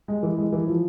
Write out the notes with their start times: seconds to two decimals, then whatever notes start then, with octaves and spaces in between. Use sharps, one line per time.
0.08 G#3
0.23 E3
0.38 G#3
0.53 E3
0.67 F3